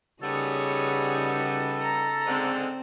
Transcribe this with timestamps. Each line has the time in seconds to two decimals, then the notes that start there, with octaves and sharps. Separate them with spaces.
0.23 C#3 G3 B3 D#4 F#4 G#4 A4 C#5
1.82 A#5
2.26 G#2 D3 G#3 C4